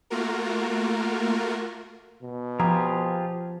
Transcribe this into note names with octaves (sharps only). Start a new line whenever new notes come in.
A3 A#3 F4 F#4 A#4
B2
F3 F4 G4 G#4 A#5